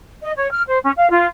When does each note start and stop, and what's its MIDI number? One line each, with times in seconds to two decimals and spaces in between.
0.22 0.31 75
0.36 0.49 73
0.50 0.62 89
0.67 0.78 72
0.82 0.91 61
0.96 1.10 77
1.10 1.27 65